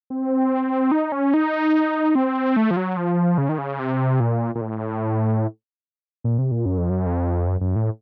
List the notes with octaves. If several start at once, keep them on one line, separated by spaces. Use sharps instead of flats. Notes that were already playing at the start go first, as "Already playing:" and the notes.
C4
D#4
C#4
D#4
C4
A3
F3
F#3
F3
C#3
D#3
C#3
C3
A#2
A#2
A2
A#2
C3
A#2
F#2
F2
F#2
F2
F#2
F#2
A2